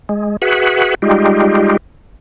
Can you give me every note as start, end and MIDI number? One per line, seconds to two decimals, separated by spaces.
0.09 0.37 56
0.42 0.95 66
0.42 0.95 68
0.42 0.95 71
0.42 0.95 76
0.42 0.95 78
1.02 1.77 55
1.02 1.77 56
1.02 1.77 63
1.02 1.77 65
1.02 1.77 67